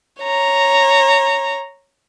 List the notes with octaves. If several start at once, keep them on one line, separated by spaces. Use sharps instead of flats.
C#5 A#5